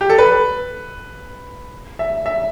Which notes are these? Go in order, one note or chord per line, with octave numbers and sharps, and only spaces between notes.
G4
A4
B4
E5
E5